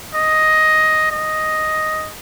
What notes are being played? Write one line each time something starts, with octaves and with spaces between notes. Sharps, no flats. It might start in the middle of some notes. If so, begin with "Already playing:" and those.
D#5
D#5